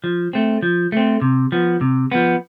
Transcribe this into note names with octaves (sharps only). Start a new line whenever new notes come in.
F3
A3 C4
F3
A3 C4
C3
F3 B3
C3
F3 B3